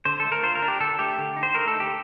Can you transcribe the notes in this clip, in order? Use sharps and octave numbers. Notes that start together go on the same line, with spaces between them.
D3 C5
A3 A4
A#4
F4 C5
A#4
D4
G4
D3 A4
A3 G4
D3
D#4
C5
A3 A#4
A4
D#4
G4